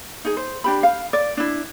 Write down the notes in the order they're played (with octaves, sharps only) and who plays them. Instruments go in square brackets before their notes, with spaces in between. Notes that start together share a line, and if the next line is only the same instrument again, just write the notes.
[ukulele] D#4 G#4
C5
D4 G4 B5
F5
D5
D4 E4